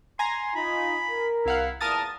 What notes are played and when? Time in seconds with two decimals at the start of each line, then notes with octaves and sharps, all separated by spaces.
0.19 G#5 A#5 C6
0.55 D#4 F4 B5
1.10 A#4
1.46 C2 E4 F5 F#5
1.81 E2 A#2 A#4 A5 D#6 A6